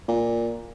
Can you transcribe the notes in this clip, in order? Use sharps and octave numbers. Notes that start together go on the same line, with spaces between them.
A#2